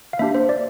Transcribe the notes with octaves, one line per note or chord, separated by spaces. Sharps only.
F5
A#3 D4 G4 E5
C5
D5